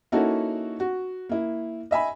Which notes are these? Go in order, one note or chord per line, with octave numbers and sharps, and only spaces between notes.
A#3 C#4 D#4 E4 F#4 A4
F#4
A#3 E4
D#5 E5 G#5 B5